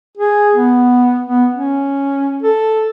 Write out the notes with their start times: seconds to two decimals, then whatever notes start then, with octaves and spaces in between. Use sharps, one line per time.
0.17 G#4
0.55 B3
1.26 B3
1.54 C#4
2.42 A4